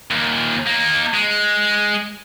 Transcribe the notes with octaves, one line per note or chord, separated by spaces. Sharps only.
D#2 A#2
A#3 D#4
G#3